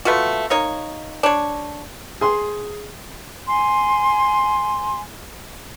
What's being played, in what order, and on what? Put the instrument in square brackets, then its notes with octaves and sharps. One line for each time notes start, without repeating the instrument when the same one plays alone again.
[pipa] A3 B3 F4 F#4
A#3 D#4 C#5
D4 C#5
[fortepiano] G#4 C6
[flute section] G#5 C6